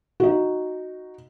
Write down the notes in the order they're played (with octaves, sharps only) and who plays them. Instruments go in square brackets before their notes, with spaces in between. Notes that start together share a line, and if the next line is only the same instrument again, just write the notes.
[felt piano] D#4 F#4